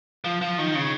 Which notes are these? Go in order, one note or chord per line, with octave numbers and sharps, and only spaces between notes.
F3
F3
D#3
C#3